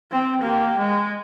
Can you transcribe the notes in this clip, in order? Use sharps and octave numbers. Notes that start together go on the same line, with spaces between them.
C4
A#3 G4
G#3